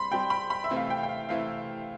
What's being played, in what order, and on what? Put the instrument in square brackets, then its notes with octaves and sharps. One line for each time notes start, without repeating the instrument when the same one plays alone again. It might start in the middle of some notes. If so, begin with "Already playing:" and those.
Already playing: [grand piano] G3 C4 [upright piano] B5 C6
[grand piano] G3 C4 G4 [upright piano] G5
[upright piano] B5
B5
E5
[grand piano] C3 E3 A3 C4 E4
[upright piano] F5
G5
G5
F5
[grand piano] C3 E3 A3 C4 E4 [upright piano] F5